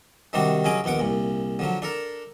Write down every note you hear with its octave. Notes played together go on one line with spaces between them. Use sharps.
C3 D#3 G3 C4 D4 F#4
C#3 F#3 C#4 D#5 D6
A#1 D#2 B3 F#5 D6
C2 A#2
D3 F3 F#3
D4 A4 A#4